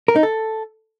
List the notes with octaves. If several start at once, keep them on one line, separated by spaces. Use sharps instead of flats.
A#4
D#4
A4